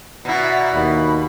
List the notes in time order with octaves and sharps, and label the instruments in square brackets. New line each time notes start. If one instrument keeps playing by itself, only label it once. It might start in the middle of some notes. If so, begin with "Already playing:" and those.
[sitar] B2 E4 [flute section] D5 F#5 A#5
[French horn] D#2 [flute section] B5